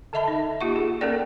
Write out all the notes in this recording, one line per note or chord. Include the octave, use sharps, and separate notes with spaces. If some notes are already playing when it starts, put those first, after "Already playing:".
D3 A4 D#5 E5 A5 B5
D#4
A#3 F4 G4 F#5 C#6
G#4
A#3 C#4 A4 A#4 D5 G5